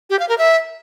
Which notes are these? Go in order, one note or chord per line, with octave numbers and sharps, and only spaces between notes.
G4
F5
A#4
E5